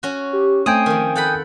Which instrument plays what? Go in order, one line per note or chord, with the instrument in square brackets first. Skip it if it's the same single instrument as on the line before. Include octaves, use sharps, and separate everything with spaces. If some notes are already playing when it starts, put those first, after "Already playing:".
[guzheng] C#4 F#4
[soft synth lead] G4
[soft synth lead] A3 [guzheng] C4 [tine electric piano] G5 G#5 D#6
[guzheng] D#3 F3
[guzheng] A4 F#5 B5 [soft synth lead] G6